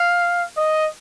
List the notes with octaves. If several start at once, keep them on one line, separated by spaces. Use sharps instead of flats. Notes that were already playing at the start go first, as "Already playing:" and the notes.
Already playing: F5
D#5